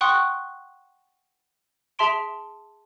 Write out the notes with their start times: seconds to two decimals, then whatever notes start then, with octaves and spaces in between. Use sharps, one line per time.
0.01 F#5 G5 C6 C#6 D#6 F#6
1.99 G#4 E5 A5 C6 D7